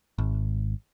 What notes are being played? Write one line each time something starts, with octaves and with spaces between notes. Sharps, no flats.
G#1